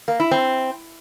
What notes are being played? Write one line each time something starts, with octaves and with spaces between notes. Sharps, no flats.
A#3
E4
C4